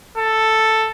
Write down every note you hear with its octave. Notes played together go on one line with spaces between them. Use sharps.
A4